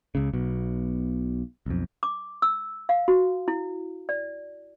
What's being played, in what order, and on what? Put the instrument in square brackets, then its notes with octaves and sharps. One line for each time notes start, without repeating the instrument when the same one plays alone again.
[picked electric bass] C#2 C#3
B1 B2
B1 F2
[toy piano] D6
E6
F5
F#4
E4
D5